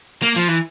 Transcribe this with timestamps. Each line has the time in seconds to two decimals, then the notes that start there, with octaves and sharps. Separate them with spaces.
0.22 A#3
0.36 F3
0.48 E3